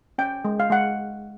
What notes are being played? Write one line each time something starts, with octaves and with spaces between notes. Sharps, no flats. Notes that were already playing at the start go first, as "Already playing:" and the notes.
C#4 G5
G#3
F5
G#3 F#5